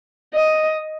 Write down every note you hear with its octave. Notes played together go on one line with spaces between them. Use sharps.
D#5